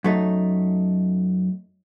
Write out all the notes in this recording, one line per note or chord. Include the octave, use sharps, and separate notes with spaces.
F#2 A3 D#4